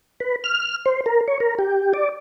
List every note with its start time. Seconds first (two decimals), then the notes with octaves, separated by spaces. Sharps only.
0.20 B4
0.44 F6
0.86 C5
1.06 A#4
1.28 C#5
1.40 A#4
1.59 G4
1.94 D5